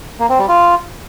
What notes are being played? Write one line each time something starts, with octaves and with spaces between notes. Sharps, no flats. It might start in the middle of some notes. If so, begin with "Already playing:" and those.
A#3
C4
G3
F4